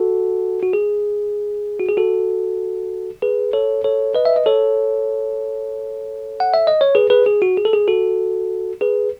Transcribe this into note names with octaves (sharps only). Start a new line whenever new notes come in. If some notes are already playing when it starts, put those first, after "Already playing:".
Already playing: F#4 A4
F#4
G#4
F#4
G#4
F#4 A4
G#4 B4
A4 C#5
A4 C#5
B4 D#5
E5
D#5
A4 C#5
F#5
E5
D#5
C#5
G#4 B4
G#4 B4
G#4
F#4
G#4
A4
G#4
F#4 A4
G#4 B4